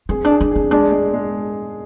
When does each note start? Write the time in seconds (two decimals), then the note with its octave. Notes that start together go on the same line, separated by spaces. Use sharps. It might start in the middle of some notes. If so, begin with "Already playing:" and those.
0.09 C4 G#4
0.25 D4
0.30 G#4
0.41 D4
0.51 C4 G#4
0.71 G#3 D4
0.92 G#3
1.14 G#3